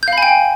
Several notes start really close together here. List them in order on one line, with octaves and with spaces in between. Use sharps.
G6 F5 B5 G#5 G5